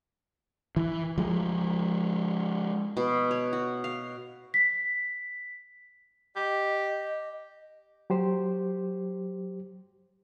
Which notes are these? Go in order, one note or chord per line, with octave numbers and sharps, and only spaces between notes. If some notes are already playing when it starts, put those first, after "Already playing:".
E3
F3 G#3
B2
C#5
F#4
F5
B6
G4 D#5
F#3 G4 C5